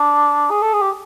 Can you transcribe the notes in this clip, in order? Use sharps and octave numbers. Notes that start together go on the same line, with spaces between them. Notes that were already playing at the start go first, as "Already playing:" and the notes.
Already playing: D4
G#4
A4
G#4
G4